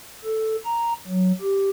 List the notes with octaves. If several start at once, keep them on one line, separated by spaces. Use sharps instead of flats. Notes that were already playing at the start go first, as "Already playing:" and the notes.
A4
A#5
F#3
G4